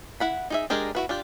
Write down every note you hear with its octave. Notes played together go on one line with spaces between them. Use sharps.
E4 F#5 B5
D#4 G#4 E5
G#3 D4 G4 G#4 A#4
E4 F#4 B4
D4 F4 G4